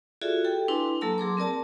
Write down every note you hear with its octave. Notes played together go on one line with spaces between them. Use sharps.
F4 F#4 G#4 A4 D5 E5
G4 A4 G5
D4 E4 B4 G#5 C6
F#3 A#3 A4 A5 A#5 E6
F#3 G#4 C6 D6
C4 A#4 D5 A5